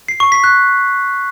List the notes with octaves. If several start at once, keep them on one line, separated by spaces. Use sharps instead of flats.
C7
C#6
B6
F#6